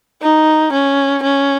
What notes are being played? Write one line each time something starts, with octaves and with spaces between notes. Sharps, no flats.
D#4
C#4
C#4